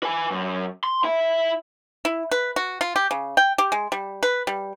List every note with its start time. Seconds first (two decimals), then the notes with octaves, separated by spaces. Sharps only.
0.03 B4 G#5
0.31 F#2
0.84 C6
1.04 E4 E5
2.05 E4
2.31 B4
2.56 F#4
2.81 F4
2.96 G4
3.11 C#3
3.37 G5
3.58 G4
3.72 G#3
3.92 G3
4.23 B4
4.47 G3